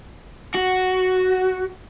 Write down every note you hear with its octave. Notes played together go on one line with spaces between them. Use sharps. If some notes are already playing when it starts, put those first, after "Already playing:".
F#4